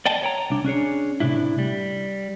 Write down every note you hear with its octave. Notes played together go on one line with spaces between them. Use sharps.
D5 D#5 G5 A5
C#5 G5 A#5
C2 D4
C#4 D4 G#4 C#5
A2 C3 E3 D4 E4
G3